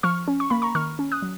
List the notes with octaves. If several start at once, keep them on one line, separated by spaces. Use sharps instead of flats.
F3 C#6 F6
C#4
C#6
A#3 B5
A#5 C#6
D#3 C#6 F6
C#4
D#6 F#6
F#3